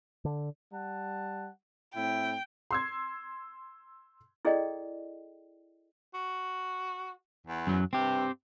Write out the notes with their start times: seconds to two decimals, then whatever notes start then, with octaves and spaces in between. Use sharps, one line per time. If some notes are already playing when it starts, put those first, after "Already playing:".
0.25 D3
0.73 G3 F#5 A5
1.95 A2 C4 E4 G5
2.71 C6 E6 G#6
4.45 E4 G#4 A4 D5 D#5 G5
6.14 F#4
7.47 E2
7.67 F#2 F#3
7.93 G2 C4 G4